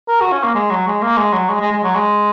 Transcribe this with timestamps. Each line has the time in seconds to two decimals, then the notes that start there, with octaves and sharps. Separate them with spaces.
0.08 A#4
0.21 F#4
0.32 C#4
0.44 A#3
0.55 G#3
0.71 F#3
0.87 G#3
1.02 A#3
1.17 G#3
1.33 F#3
1.49 G#3
1.61 G#3
1.72 G#3
1.83 F#3
1.95 G#3